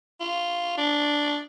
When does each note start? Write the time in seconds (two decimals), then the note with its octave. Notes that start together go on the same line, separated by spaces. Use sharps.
0.21 F4
0.78 D4